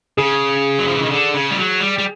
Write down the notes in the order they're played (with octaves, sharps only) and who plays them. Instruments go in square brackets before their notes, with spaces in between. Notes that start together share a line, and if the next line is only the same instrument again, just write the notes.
[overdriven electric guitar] C#3 [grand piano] G#4
[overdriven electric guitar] F#3
F3
E3
D#3
D3
C#3
G3
F#3
G3
G3